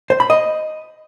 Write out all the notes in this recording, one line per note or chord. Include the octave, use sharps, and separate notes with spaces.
C5
B5
D#5